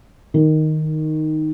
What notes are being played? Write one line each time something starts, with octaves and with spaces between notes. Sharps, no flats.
D#3